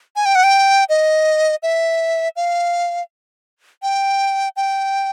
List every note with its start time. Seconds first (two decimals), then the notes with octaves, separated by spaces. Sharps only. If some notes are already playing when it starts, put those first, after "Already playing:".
0.16 G#5
0.26 G5
0.35 F#5
0.44 G5
0.89 D#5
1.63 E5
2.36 F5
3.83 G5
4.57 G5